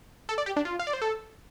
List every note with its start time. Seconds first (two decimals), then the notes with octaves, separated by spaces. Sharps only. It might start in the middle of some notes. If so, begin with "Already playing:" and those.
0.29 A4
0.38 D5
0.46 G4
0.57 D4
0.65 F4
0.79 F5
0.87 D5
0.93 C5
1.02 A4